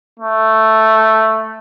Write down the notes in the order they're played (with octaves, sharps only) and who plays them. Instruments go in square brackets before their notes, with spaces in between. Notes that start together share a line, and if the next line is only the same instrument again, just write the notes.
[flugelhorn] A3